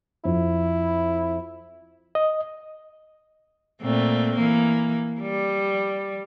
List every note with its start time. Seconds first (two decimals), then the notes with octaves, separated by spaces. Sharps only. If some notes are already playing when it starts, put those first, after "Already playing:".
0.25 F2 E4
2.15 D#5
3.82 A#2 A3 C4
4.35 E3 A#3
5.21 G3